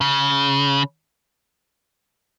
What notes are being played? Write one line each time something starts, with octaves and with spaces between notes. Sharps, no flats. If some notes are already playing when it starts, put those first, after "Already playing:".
C#3